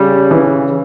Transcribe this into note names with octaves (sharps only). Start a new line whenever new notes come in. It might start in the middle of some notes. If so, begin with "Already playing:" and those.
Already playing: C#3 G3
E3